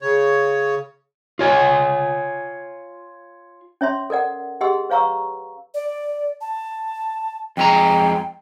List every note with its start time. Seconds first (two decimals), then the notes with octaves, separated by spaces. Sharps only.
0.02 C#3 C#5
1.39 F4 C#5 G#5
3.81 C#4 C#5 E5 C6
4.10 A4 A#4 D5 F#5
4.61 G4 G#4 D#5 F#5 C6 E6
4.90 B4 C#5 F5 A#5 C#6 E6
5.74 D5
6.41 A5
7.57 F2 G#3 G5 A#5